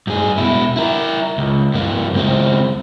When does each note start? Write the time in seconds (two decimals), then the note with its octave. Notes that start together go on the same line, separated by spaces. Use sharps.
0.07 G2 G#4
0.38 B2 E4
0.77 E4 A#4
1.38 C#2
1.74 G2 A#3
2.14 C#2 C4